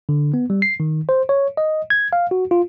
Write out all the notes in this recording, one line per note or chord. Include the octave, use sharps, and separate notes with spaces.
D3
B3
G3
C7
D#3
C5
C#5
D#5
G#6
F5
F#4
F4